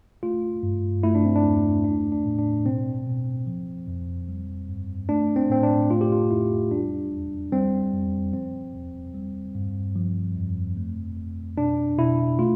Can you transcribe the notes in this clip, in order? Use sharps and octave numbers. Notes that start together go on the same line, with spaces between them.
A3 F4
G2
A3 E4
D4
C4
D4
E2
A3 D4
D4
A2
D4
B2 C4
B2
F3
F2
G3
G2
A3 D4
C4
A2 C4
D4
A3 F4
G4
F4
F2 E4
G3 D4
E2
G3 C4
F2
F3 C4
E2
G3
G2
F3
F2
A3
F2
B2 D4
B2 E4
A3 F4